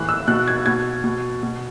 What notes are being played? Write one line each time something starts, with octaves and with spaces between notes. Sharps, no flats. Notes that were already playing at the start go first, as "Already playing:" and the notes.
Already playing: A2 E3 F#6
E6
B2 F#6
G#6
B2 G#6
B2
B2